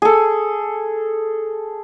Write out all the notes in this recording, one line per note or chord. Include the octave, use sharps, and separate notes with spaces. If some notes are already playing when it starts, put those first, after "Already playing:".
G#4 A4